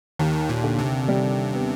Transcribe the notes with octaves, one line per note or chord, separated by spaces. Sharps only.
D#2 D#3
A#2
D3
C3
G3
B3